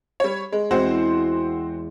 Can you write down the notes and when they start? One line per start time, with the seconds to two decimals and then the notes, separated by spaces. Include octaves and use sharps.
0.20 G3 C#5
0.52 G#3
0.71 E2 G#3 C4 F#4 C5